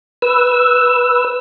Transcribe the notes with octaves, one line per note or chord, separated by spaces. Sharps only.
B4 E6